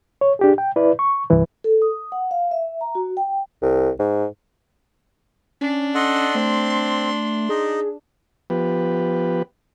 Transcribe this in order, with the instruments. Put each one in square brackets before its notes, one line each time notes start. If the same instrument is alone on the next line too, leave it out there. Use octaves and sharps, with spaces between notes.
[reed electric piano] C#5
D4 G4 G#4
G5
E4 B4 D5
C#6
C2 G2 E3 B4
[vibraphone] A4
D#6
F#5
F5
E5
A#5
F#4
G5
[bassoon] C2
G#2
[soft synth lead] C#4 [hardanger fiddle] D4
[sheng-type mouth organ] A4 D#5 F#5 [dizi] C6
[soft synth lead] A3 [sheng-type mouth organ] C4
[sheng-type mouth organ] D#4 [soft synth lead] G#4
[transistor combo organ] F3 B3 G4 B4